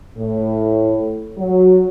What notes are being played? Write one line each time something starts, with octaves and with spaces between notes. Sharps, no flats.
A2
F#3